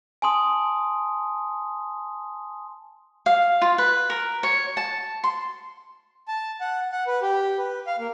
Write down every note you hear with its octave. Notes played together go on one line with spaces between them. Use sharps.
G#5 A5 C6 D#6
F5
F4
B4
A#4
C#5
A5
C6
A5
F#5
F#5
B4
G4
B4
F5
A#3